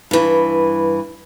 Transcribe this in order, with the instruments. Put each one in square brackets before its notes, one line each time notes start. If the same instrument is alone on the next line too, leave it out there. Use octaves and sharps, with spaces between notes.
[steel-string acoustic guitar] G2 E3